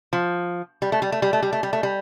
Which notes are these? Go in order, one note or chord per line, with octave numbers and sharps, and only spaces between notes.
F3
G3
A3
G3
A3
G3
A3
G3
A3
G3
A3
G3